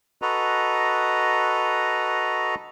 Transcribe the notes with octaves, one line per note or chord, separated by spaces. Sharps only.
F#4 A4 B4 D#5 A#5